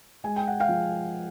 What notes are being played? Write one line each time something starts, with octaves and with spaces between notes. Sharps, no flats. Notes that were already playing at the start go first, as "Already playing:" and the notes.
G#3 G#5
G5
F#5
F5 G5
F3